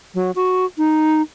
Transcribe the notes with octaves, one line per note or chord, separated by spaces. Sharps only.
F#3
F#4
D#4